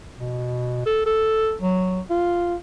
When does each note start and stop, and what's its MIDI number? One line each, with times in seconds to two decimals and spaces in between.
0.19 0.83 47
0.86 1.04 69
1.06 1.55 69
1.60 2.00 54
2.10 2.55 65